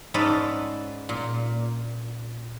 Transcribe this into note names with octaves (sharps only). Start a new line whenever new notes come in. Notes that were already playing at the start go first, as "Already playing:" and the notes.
G#2 C#4 A4 B4 D5 A5
A#2